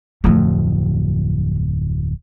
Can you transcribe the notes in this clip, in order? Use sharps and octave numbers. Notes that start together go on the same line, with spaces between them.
D1 F2 F3 A3